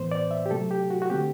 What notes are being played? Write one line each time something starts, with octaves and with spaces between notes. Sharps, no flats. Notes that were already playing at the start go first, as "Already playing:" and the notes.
Already playing: A2 E3 B3 C5
D5
E5
G4
C3 F#3 A3 A4
G4
F#4
F#4
D3 A3 C4 G4